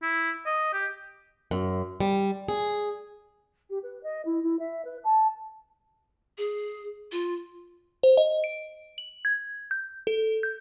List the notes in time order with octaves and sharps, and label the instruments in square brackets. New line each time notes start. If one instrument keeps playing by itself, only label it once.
[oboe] E4
D#5
G4
[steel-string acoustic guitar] F#2
G3
G#4
[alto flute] G4
B4
D#5
E4
E4
E5
B4
A5
[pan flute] G#4
F4
[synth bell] C5
D#5
D7
F#7
G#6
G6
A4
G6